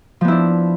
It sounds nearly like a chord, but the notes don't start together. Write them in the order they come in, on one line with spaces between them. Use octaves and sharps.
F3 B3 E4 D4